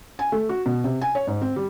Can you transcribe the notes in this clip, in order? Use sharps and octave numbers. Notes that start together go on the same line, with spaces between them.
G#5
A3
F#4
B2
C3
G#5
C#5
G#2
C4
G3